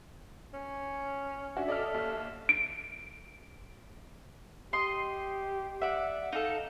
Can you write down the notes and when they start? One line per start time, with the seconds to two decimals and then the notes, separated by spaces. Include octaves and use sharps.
0.54 C#4
1.57 C#4 D4 F#4 E5
1.68 A4 D5 D#5 F6
1.94 D#2 F6
2.49 D7
4.73 G4 D#5 C6
5.82 D5 E5 F#5
6.32 D#4 A4 F5